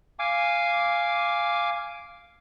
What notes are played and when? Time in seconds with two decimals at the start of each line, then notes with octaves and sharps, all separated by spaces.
0.19 F5 G#5 D6